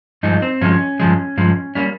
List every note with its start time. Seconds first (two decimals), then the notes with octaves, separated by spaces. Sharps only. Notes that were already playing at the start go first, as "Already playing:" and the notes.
0.23 G2 F3 G#3 D#4
0.42 C4
0.61 G2 F3 G#3 C#4
1.00 G2 F3 G#3
1.37 G2 F3 G#3
1.75 G3 A#3 C#4